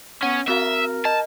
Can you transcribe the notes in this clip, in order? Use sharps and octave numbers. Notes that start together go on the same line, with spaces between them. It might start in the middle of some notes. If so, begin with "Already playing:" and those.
B3 C#4 F#5
C4 F#4 A#4 E5 F5
D#5 A5